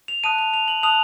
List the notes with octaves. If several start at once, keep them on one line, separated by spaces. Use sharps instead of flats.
F7
A5 D#6 F#6 D#7
F7
F7
F#7
A5 D#6 F#6 F7